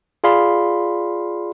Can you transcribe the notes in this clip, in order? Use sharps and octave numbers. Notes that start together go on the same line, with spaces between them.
F4 G#4 D5 F5 B5 C6